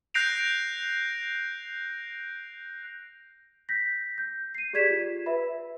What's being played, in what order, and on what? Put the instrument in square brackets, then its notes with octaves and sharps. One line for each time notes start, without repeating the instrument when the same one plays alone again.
[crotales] F#6 G6 A#6 C7 D7 F7
[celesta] G6 A#6 B6
G6
C7 D#7
G4 G#4 D5 G#6 B6 E7
F4
B4 E5 B5